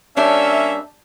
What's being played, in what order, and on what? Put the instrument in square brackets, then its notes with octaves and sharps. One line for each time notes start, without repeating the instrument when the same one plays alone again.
[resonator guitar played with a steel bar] G3 D4 C#5 [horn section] A#3 C#4 E5